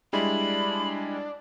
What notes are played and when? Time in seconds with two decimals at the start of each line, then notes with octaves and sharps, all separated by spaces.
0.13 G3 G#3 D4 E4 B5